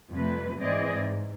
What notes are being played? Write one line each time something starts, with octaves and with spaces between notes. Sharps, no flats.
F2 C3 G3 A3 B4
G#2 E3 C4 G#4 D5 D#5
G#2